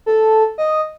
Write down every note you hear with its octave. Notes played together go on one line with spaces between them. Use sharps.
A4
D#5